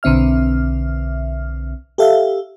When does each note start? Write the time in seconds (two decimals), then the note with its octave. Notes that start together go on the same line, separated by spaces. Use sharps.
0.03 B1 D3 C4 E5 F6
1.98 G4 A4 E5 F5